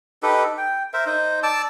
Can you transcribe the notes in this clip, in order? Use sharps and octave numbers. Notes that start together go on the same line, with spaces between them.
D#4 G4 A4 B4
G5
A#4 C5 E5
D#4 C5
D5 A5 D6 E6